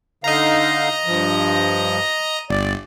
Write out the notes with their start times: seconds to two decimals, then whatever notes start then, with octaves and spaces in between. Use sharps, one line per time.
0.24 D3 D#4 D#5 F5 A#5
1.06 G2 F3
2.50 G1 D5